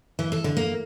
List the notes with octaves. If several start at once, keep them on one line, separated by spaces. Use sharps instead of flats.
E3
A4
D3
A#3